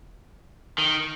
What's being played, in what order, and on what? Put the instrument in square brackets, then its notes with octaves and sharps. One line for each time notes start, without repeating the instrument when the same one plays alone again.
[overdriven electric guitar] D#3